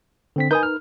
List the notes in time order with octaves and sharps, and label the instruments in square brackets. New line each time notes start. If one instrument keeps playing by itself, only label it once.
[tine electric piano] D3 C4 B6
[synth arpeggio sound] D#4 A#4 B4 [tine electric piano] G#5 D#6 G6
[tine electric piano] F6